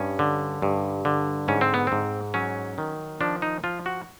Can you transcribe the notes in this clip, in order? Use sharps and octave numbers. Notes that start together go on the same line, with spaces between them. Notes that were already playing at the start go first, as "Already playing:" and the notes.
Already playing: G2 C#4
D3
G2
D3
G#2 C#4
C4
B3
G#2 C4
F#3 C#4
D#3
F3 D4
D#4
F3 F4
F#4